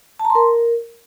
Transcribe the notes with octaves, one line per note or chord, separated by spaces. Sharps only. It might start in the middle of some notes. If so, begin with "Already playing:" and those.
A5
A#5
C6
A#4